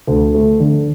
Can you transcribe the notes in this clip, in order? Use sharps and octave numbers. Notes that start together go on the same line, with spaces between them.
D2
A3
D3